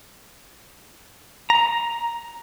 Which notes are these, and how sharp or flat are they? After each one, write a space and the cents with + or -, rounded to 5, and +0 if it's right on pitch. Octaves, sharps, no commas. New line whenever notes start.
A#5 +5